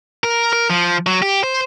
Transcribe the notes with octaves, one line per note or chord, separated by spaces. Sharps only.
A#4
A#4
F3
F#3
G4
C5